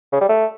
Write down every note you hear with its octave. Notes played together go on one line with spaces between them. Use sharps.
C#3
G3
A3